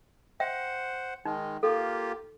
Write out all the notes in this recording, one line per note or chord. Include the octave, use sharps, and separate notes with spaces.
C5 E5 F#5 G5
D#3 G#3 D#4
A#3 F4 G4 A4